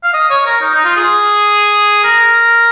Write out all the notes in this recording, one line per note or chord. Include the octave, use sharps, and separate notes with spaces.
F5
D#5
C#5
A#4
D#4
D#4
F4
G#4
A#4